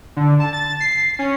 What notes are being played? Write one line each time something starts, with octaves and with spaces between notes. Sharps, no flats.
D3
A5
A6
C7
C#4